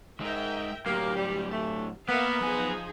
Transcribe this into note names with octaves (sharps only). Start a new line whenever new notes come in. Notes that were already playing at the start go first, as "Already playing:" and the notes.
G#3 D#4 A#4 E5 G5
A2 F#3 A#3 G4
G3
A3
A#3 B3 A#4 E5 F5
F3 F#3 D#4 G#4 G#5